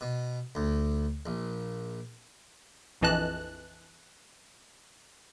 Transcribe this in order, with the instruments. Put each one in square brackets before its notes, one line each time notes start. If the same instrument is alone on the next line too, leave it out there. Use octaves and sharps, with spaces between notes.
[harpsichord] B2
D2
A#1
[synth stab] A#1 F2 E3 D#5 A5 F#6